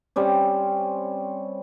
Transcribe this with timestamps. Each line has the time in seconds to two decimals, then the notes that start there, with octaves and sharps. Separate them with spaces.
0.16 G3 C4 C#4